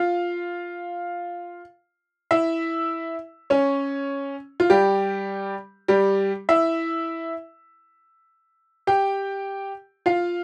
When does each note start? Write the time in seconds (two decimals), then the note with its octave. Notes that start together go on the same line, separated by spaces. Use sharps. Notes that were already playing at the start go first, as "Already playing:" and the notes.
Already playing: F4 F5
2.31 E4 E5
3.50 C#4 C#5
4.60 F4
4.70 G3 G4
5.88 G3 G4
6.49 E4 E5
8.87 G4 G5
10.06 F4 F5